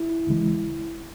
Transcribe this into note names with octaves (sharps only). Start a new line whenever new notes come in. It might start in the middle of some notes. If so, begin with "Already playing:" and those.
Already playing: E4
D2 C#3 E3 G#3